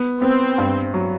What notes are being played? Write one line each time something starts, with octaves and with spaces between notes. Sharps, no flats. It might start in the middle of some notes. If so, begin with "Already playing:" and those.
Already playing: B3
B3 C4
G2
F#3